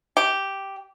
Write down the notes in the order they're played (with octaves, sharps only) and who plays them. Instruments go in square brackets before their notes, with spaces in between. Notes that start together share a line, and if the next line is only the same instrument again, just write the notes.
[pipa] G4